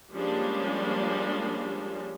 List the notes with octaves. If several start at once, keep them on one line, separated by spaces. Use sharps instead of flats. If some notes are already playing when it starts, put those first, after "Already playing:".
F3 G3 G#3 A#3 C#4 D4